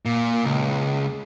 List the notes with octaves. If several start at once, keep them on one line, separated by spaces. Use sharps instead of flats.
A#2
C#2